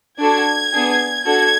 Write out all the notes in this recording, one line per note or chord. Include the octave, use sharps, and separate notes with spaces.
D4 F#4 A4 G#6
B3 D4 G#4
D4 F#4 A4 G#6